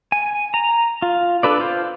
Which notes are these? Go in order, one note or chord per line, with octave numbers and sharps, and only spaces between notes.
G#5
A#5
F4
D4 A4 B4 D5
F4 C5